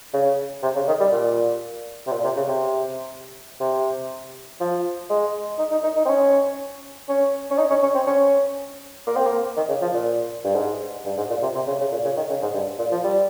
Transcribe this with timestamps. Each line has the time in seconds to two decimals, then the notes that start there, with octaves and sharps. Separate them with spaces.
0.14 C#3
0.62 C3
0.76 C#3
0.88 D#3
1.00 G3
1.12 A#2
2.07 C3
2.12 A#2
2.24 C3
2.36 C#3
2.48 C3
3.60 C3
4.60 F3
5.10 G#3
5.59 D#4
5.72 D#4
5.84 D#4
5.97 D#4
6.05 C4
6.09 C#4
7.09 C#4
7.51 C#4
7.58 D#4
7.70 C#4
7.83 C#4
7.95 C4
8.07 C#4
9.07 A#3
9.16 C4
9.26 A#3
9.57 D#3
9.69 C#3
9.81 F3
9.94 A#2
10.44 G2
10.55 G#2
11.05 G2
11.17 G#2
11.30 A#2
11.42 C3
11.55 C3
11.67 C#3
11.80 C#3
11.92 A#2
12.05 C#3
12.17 D#3
12.29 C#3
12.42 G#2
12.54 G2
12.79 A#2
12.92 F3
13.04 G3